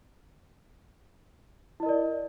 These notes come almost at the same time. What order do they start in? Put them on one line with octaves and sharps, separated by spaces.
E4 D#5 A#4 D5